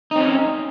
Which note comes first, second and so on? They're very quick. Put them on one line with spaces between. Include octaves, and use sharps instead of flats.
D#4 C4 C#4